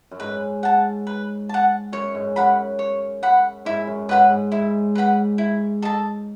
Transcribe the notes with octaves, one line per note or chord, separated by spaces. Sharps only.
F#2
G#2 B4
F#5 A5
B4
F#5 A5
F#2 C#5
G#2
F#2 F#5 B5
C#5
F#5 B5
G#2 E4
F#2
G#2 B4 F#5 B5
G#2
G#2 E4
B4 F#5 B5
E4
A4 D#5 A5